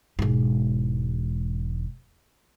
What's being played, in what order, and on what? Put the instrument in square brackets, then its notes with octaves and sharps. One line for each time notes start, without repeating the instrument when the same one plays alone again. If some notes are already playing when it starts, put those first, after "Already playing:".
[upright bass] E1 G#2